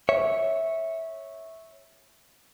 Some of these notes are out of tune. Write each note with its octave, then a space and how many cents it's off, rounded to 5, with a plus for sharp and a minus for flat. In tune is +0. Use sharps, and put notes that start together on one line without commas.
C#5 -5 E5 -10